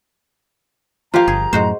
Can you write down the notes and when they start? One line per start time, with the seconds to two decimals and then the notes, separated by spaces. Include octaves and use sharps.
1.14 F3 A#3 F4 G4 F5 A#5
1.28 G1 G#4
1.53 F#2 A2 G#3 F#4 C5